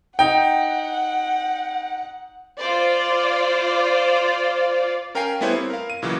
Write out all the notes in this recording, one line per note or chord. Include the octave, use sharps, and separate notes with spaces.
D#4 F#5 G5
F4 C5 D5
C#4 A#4 F5 G5 G#5 C7
G3 A3 B3 E4 C5 C#5
C4 E4
A#4 F5
D#7
B1 A#2 C#3 E3 F#3